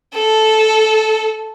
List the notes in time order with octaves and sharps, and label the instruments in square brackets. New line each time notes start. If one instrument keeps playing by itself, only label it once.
[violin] A4